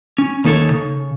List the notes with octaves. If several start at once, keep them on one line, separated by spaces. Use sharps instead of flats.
C#4
D#2 A#3 D#4 A4 C#5
C#3